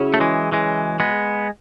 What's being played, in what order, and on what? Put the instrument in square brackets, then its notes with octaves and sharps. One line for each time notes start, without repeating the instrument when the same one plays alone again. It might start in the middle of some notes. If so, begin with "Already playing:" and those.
Already playing: [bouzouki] C#3 F#3 C#4 E4
[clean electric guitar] A3
E3 G#3
E3 G#3
G#3 B3